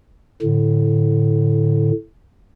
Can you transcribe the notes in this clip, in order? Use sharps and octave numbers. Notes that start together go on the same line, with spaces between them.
A2 D3